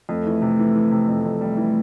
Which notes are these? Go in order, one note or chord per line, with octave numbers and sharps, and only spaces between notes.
F2 A3
E3
C3
E3
E3
C3
F2
F2
G3
E3